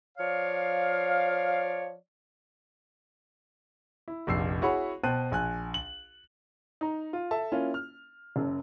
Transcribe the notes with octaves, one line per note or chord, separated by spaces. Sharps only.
F3 C#5 D5 F5
E4
F1 A#1 E6 C7
E4 F#4 G#4 C#5 F#5 B5
B2 C5 G5 A5 F#6 D#7
A#1 G#5 F#6
F#7
D#4 A#5
F4
A4 E5 A5
A#3 C#4 E4 F4
F6
F#1 F#2